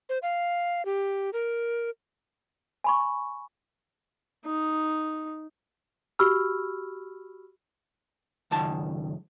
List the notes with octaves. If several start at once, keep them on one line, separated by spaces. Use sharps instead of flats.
C5
F5
G4
A#4
G#5 B5 C#6
D#4
F#4 G4 B5 C#6 E6 F6
C#2 F#2 D#3 A5